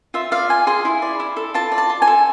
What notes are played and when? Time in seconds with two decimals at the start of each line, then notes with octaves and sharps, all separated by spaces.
0.14 F4 E5
0.31 D5 F5
0.49 F4 G#5
0.67 G#4 C6
0.85 E4
1.02 D5
1.20 E4
1.37 A4
1.54 F4 A5
1.72 D5
1.78 A5
1.90 F4
2.02 G#5
2.07 A4